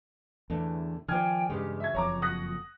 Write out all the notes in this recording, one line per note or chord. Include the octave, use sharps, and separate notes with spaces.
E2 A2 D3 E3
D#3 F3 C5 D5 G5 G#5 F6 G#6
E2 G2 C#3 G#3 G4
F#4 E5 G#6
F#1 F2 C#5 A#5 D6
F#5 D#6 F#6 A#6